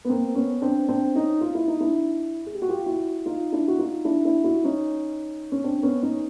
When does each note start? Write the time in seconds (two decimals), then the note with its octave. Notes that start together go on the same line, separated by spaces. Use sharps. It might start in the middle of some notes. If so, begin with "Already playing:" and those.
0.05 B3
0.09 A#3 C4
0.35 B3 C#4
0.62 C4 D4
0.88 C4 D4
1.15 C#4 D#4
1.41 F4
1.55 E4
1.68 D#4
1.80 D4 E4
2.46 G#4
2.55 G4
2.62 F#4
2.69 F4 G4
2.86 E4 F#4
3.26 D#4 F4
3.52 D4 E4
3.68 F#4
3.79 D#4 F4
4.05 D4 E4
4.25 D4 E4
4.44 E4 F#4
4.64 C#4 D#4
5.52 C#4
5.64 C4 D4
5.83 B3 C#4
6.03 C#4 D#4